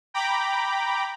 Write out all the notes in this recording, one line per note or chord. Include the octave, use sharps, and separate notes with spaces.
G5 A#5 B5 D6